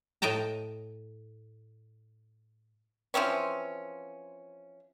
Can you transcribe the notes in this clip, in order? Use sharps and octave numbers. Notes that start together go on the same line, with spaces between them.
A2 D#5 G5 A5 A#5
E3 F3 C4 C#4